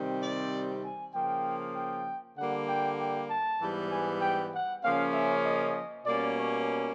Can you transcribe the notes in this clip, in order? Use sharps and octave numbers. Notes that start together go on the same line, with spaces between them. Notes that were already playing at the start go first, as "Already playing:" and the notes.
Already playing: C3 D#3 G3 C4
D5
G#5
C#3 F3 A#3 G5
G5
D3 G3 A#3 F#5
G5
G5
A5
G#2 E3 G3 B3
G#5
G5
F#5
C#3 F3 A#3 C#4 F5
E5
D#5
B2 G3 A#3 C#4 D5
C#5